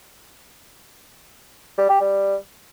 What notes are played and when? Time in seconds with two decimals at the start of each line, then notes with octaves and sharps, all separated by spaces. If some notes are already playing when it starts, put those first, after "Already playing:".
1.78 G3
1.89 G4
2.01 G3